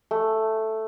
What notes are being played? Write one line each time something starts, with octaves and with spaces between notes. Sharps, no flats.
A3